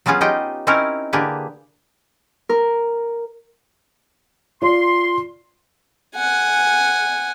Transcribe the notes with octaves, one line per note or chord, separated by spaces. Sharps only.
F#3 B3 C#4 F4 G#4
D#4 F4 G4 D#5 G5
C4 C#4 D#4 E4 A#4 C#5
D3 A#3 G4 G#4 B4
A#4
F4 D5 C6
F#5 G#5